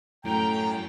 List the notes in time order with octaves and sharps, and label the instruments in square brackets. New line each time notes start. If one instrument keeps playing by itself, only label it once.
[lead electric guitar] F#2 [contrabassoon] A2 [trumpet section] G5 [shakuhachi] A#5